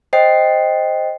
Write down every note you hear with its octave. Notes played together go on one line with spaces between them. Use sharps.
C5 D#5 G5 C7